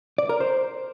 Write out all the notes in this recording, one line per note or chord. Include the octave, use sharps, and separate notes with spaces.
D5
A#4
C5